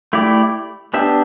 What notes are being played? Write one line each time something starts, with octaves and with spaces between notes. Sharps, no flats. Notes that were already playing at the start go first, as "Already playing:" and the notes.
A3 E4 G4 D5
B3 D4 G4 E5